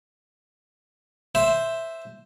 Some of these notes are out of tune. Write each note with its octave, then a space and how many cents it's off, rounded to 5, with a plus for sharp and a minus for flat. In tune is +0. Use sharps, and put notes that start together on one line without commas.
C5 +0 E5 +0